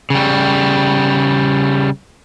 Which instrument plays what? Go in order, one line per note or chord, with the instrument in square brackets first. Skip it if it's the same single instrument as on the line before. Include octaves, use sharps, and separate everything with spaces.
[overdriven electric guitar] C#3 G3